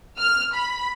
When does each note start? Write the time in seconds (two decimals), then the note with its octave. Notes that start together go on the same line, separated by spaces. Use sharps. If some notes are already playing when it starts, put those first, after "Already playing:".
0.19 F6
0.55 B5